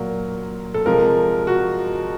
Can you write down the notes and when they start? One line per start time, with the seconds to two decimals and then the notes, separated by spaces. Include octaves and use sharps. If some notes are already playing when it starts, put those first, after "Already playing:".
Already playing: A#2 F#3 A#4
0.74 A4
0.85 C3 F3 G#3 A#4
1.47 F#4